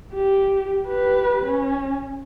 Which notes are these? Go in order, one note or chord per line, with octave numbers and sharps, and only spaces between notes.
G4
G4 B4
C#4